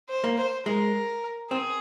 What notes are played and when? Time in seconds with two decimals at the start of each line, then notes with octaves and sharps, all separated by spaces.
0.09 C5
0.24 A#3
0.38 C5
0.66 G#3 A#4
1.50 C4 G#4